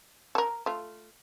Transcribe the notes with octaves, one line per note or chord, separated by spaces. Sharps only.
A4 A#4
A3 F4